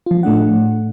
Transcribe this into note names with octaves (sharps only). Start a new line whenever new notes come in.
F3 F4
A2 A3 D4 F#5